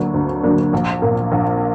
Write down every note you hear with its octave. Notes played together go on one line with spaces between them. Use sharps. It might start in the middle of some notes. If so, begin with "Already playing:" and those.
Already playing: D2 D3 F#3 A#3 D4
D2
D3 F#3 A#3 D4
A#1
A#2 A#3
A#1